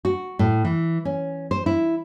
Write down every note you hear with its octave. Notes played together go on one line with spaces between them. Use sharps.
F#4
A2
E3
C#4
C5
E4